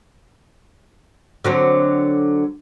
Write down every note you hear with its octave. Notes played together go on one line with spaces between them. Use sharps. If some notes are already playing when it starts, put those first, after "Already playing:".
D3 F#3 C4